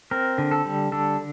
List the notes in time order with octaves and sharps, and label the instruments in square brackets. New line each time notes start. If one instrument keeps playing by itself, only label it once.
[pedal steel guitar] C4 A#4
D3
A4
G3
D3 A4